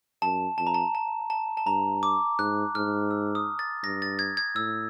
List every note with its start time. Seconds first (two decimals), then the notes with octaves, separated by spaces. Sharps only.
0.22 F#2 A5
0.58 F2 A5
0.67 A#5
0.74 A5
0.95 A5
1.30 A5
1.57 A5
1.66 G2 A#5
2.03 D6
2.39 G#2 F#6
2.75 G#2 F6
3.11 E6
3.35 D#6
3.59 A6
3.84 G2 A#6
4.02 A6
4.19 G#6
4.37 G#6
4.56 A2 E6